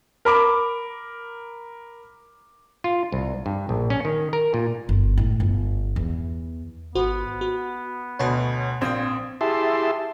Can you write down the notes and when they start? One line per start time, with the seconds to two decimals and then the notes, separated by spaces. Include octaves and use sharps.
0.25 A#4 B5 D6
2.84 F4
3.12 C2
3.46 G2
3.69 A#1
3.90 C#4
4.05 D#3
4.33 A#4
4.54 A#2
4.89 G1
5.18 A2
5.40 G1
5.96 E2
6.95 G#1 B3 F#4 C5
7.41 F#4
8.19 D2 B2 D3 C#5 F#5
8.81 A#1 C4 F5 D#6 G#6
9.41 E4 G4 G#4 E5 A5 C6